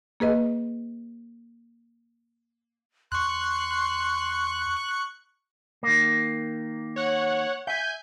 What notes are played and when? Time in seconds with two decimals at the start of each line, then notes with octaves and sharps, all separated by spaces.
0.20 A#3 G#4 B4 D#5
3.12 E2 C6 C#6 F#6
5.83 D#3 A#3
6.96 C#5 F#5
7.67 E5 G#5 G6